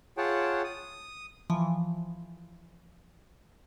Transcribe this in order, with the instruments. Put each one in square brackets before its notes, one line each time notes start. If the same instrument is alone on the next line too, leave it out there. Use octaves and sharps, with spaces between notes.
[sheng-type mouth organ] F4 G#4 C#5 F#5 G5 A5
D#6
[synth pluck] E3 F3